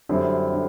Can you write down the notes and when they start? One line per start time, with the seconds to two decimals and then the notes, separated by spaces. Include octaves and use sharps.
0.09 F#2 D3 G3 C4 E4
0.53 D3